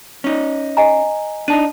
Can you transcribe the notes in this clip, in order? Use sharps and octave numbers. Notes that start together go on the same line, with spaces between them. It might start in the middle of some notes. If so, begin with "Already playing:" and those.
C#4 D#4
D#5 G#5 A#5
D4 D#4 A5 D#7